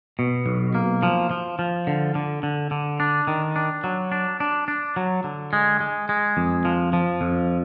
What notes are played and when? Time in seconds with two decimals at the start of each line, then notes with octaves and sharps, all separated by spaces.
0.19 B2
0.46 B1
0.75 A#3
1.03 F3
1.31 F3
1.59 F3
1.87 D3
2.15 D3
2.43 D3
2.71 D3
3.00 D4
3.27 D#3
3.56 D4
3.84 F#3
4.12 D4
4.40 D4
4.68 D4
4.96 F#3
5.24 D3
5.53 G#3
5.80 G#3
6.09 G#3
6.37 F2
6.65 F3
6.93 F3
7.21 F2